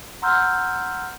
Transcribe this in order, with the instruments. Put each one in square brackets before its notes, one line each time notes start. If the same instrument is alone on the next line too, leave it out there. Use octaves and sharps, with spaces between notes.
[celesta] F#5 A#5 C6 E6 F6 G6